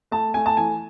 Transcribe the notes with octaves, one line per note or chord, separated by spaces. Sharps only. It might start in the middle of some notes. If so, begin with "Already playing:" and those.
A3 A5
A3 G#5
A5
E3 G#5